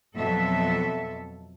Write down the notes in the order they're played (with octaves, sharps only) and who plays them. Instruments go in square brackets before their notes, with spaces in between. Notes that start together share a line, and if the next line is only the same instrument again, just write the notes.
[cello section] F2 B2 F#3 A4 E5